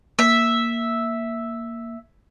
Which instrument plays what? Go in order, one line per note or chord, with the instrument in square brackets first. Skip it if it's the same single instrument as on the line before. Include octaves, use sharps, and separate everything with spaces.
[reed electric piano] A#3 [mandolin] E5